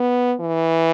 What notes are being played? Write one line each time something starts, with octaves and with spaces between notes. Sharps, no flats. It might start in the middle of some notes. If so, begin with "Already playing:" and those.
Already playing: B3
E3